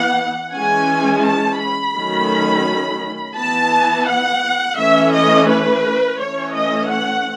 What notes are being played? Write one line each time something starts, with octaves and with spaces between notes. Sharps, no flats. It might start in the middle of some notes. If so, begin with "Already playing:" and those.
Already playing: E3 B3 F#5
E3 G#3 C#4 G#5
A5
B5
D#3 F#3 A3 C#4
E3 B3 A5
F#5
E3 A3 C#4 E5
D#5
B4
E3 A3 C#4 C#5
D#5
F#5